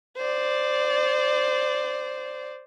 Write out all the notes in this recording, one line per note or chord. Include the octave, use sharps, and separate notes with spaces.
C5 D5